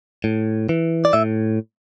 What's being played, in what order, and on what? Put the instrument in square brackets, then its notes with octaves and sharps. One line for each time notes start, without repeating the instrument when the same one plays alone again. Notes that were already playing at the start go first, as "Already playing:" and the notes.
[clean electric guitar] A2
E3
D5
A2 E5